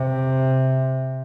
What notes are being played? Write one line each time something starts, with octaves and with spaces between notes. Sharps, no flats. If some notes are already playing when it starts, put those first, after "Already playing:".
Already playing: C3